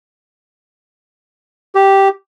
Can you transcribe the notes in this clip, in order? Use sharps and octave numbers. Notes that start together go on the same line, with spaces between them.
G4